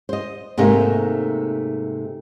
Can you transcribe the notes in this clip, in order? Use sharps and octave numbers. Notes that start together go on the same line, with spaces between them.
C5 D#5
G#2 C3 A3 A#3 D#4